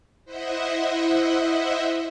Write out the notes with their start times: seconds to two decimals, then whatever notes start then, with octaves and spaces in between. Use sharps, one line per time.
0.25 E4 C5 D#5 E5 F#5